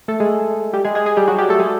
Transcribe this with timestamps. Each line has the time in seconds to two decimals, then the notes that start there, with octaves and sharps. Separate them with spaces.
0.08 A3 A4
0.20 G#3 G#4
0.73 G3 G4
0.85 G#3 G#4
0.95 G#3 G#4
1.06 G#3 G#4
1.17 G3 G4
1.27 F#3 F#4
1.38 G3 G4
1.49 A3 A4
1.60 G#3 G#4